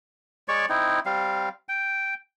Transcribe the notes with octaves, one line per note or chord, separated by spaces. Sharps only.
G#3 C#5 D5 C#6
C4 D#4 E4
G3 C4 F5
G5